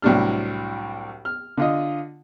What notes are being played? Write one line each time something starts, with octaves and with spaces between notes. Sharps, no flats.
C2 A2 F#3 D4 F6
F6
D3 F4 D#5